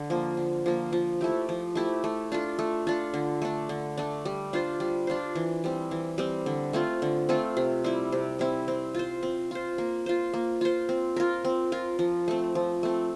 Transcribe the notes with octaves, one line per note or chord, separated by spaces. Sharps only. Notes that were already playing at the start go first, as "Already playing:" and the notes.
Already playing: D3
F3 A#3
D3
F3 A#3
F3
A3 E4 G4
F3
A3 E4 G4
A3
D4 F4 A4
A3
D4 F4 A4
D3
A3 D4
D3
A3 D4
G3
D4 F4 C5
G3
D4 F4 C5
E3
G3 C4
E3
G3 C4
D3
A3 C4 F4
D3
A3 C4 F4
C3
G3 C4 E4
C3
G3 C4 E4
C4
F4 C5
C4
F4 C5
A#3
F4 C5
A#3
F4 C5
C4
F4 A#4
C4
F4 A#4
F3
A3 C4
F3
A3 C4